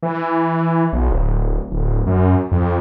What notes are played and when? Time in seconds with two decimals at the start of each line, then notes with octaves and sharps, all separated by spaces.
0.03 E3
0.93 B1
1.10 D1
1.72 D1
2.07 F#2
2.52 F2